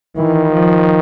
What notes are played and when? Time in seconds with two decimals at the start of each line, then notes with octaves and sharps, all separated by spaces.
0.17 D#3 E3
0.53 F3